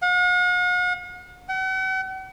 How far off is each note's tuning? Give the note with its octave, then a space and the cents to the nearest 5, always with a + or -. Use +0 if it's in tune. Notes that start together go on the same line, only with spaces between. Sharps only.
F#5 -45
F#5 +40